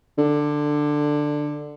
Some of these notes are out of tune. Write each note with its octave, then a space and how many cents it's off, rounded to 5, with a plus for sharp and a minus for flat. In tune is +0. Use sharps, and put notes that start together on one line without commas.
D3 +10